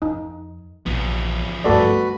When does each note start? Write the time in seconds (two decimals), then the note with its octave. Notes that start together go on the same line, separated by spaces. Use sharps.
0.02 F2 D#4
0.86 A#1 E3 F3 B3
1.64 G2 D3 A3 F#4 A4 B4 D5